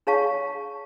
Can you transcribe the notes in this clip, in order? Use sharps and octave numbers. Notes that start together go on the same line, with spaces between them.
D4 G#4 C#5 F5 A5 C#6